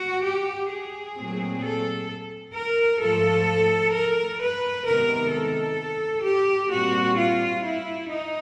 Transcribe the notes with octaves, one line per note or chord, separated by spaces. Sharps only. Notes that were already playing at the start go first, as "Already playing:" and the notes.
Already playing: F#4
G4
G#4
A#2 F#3 A3 C4
A4
A#4
G#2 F3 A3 A4
A#4
B4
C3 D#3 G#3 B3 A#4
A4
G4
A#2 G3 C4 F#4
F4
E4
D#4